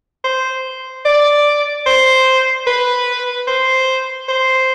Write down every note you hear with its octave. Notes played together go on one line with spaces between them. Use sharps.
C5
D5
C5
B4
C5
C5